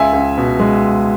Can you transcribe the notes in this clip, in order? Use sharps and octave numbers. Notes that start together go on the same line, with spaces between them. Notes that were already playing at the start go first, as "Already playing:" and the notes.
Already playing: C#2 E5 G#5
C#2
B2
G#3